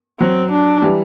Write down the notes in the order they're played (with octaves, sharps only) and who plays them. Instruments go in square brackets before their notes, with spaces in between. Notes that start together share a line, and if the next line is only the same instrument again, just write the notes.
[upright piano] F#3 [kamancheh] C4
[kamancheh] D4
[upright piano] E3 G3